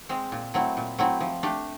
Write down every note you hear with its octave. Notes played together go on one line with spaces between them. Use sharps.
G#3 C4
A#2
F#3 A3 C4 E4
A#2
F#3 A3 C4 E4
F3
A3 D4 G4